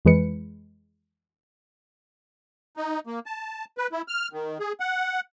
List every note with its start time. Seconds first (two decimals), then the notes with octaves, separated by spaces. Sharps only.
0.05 F2 E3 G#3 B4 C#7
2.77 D#4
3.07 A#3
3.26 A5
3.78 B4
3.92 E4
4.08 F6
4.33 D#3
4.60 G#4
4.80 F#5